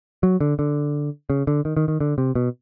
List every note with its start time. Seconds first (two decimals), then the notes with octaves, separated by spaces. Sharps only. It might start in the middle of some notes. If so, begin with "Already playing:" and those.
0.23 F#3
0.41 D3
0.59 D3
1.30 C#3
1.47 D3
1.65 D#3
1.77 D#3
1.88 D#3
2.01 D3
2.18 C3
2.35 B2